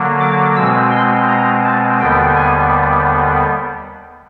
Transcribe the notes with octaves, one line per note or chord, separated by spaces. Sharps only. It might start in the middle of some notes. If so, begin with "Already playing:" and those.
Already playing: D3 F#3 A#3
D6
B2 G#3 C4 E6
C6
A#5
A5
D#2 D3 G3 B3 G5
G#5